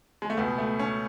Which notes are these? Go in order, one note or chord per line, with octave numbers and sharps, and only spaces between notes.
G#3
A3
C#2 B2 B3
A3
C#4